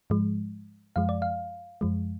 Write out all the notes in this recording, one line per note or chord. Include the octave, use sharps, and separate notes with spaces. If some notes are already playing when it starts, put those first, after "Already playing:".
G#2 F3 G#3
F#2 F3 G#3 F5
D5
F5
F#2 F3 G#3